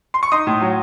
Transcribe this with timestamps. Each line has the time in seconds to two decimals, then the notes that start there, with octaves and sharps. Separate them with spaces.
0.14 C6
0.23 C#6
0.32 D#4 C6 D#6
0.47 A2
0.61 F#3